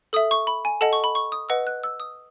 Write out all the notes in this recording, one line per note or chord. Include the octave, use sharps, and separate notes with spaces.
A4 E5 D#6
C#6
B5
G#5
A4 D#5 F#5 A5
C#6
B5
C#6
D#6
B4 D#5 F#5 E6
F#6
E6
D#6